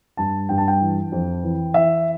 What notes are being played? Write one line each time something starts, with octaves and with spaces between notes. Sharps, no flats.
G2 A5
G2 G5
A5
G5
E3
F2
E3
E3 E5